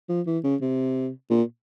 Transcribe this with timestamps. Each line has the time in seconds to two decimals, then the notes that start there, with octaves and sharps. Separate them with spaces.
0.09 F3
0.27 E3
0.44 C#3
0.61 C3
1.30 A#2